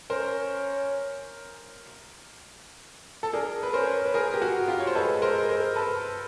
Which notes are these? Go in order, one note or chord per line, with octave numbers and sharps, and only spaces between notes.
C#4 A#4 C5
A4
D4 G#4 A#4
B4
C#4 A#4 C5
B4
G#4 A#4
G4
F#4 G#4
F4 G4
C#5
C5
G#3 A4 B4
A#4 C5
A#4 C5
A4 B4